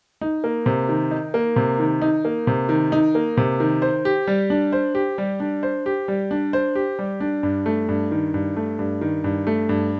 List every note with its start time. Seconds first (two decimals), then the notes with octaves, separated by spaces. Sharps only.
0.21 D#4
0.44 A#3
0.66 C3
0.89 D#3
1.11 D#4
1.34 A#3
1.56 C3
1.79 D#3
2.02 D#4
2.25 A#3
2.47 C3
2.69 D#3
2.92 D#4
3.15 A#3
3.37 C3
3.60 D#3
3.82 C5
4.05 G4
4.27 G3
4.50 D4
4.73 C5
4.95 G4
5.18 G3
5.40 D4
5.63 C5
5.86 G4
6.08 G3
6.31 D4
6.53 C5
6.75 G4
6.99 G3
7.20 D4
7.43 G2
7.66 A3
7.89 G2
8.11 D#3
8.34 G2
8.56 A3
8.79 G2
9.01 D#3
9.24 G2
9.47 A3
9.69 G2